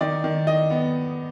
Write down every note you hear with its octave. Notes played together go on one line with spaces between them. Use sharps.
D#3 D5
D#3
D#3 D#5
B3